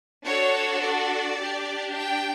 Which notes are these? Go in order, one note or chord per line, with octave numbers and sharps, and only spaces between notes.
D4 F#4 A4 C#5
D5
D4 G4
G5